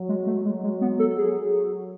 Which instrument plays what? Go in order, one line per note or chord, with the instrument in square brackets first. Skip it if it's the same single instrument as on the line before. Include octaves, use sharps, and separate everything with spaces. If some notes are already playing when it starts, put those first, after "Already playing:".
Already playing: [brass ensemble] F#3
[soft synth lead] G#3
A3
[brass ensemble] F#3 [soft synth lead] G#3
[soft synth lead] G#3
B3
A4
[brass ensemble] F#3 [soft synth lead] G#4